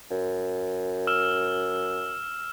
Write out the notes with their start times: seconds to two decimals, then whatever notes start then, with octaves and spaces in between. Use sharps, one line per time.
0.11 F#2
1.07 E6 F6 E7